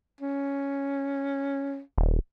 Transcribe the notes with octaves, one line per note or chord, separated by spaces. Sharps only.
C#4
D#1